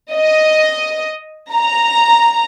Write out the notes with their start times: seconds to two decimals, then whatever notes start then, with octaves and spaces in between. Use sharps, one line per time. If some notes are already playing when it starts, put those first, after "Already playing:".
0.13 D#5
1.53 A#5